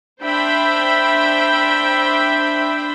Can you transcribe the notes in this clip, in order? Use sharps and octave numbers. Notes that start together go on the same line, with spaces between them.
D4 C5 E5 G5 B5